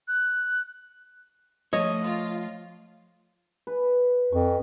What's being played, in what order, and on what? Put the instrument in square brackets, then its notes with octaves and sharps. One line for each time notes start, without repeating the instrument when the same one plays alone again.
[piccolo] F#6
[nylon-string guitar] F3 A3 [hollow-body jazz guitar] C#5 [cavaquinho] D#5
[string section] F4
[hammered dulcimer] B4
[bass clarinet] F2 [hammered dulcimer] C#6